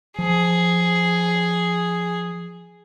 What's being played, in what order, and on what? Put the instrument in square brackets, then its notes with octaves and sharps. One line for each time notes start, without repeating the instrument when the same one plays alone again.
[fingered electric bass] F3 [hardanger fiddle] G#4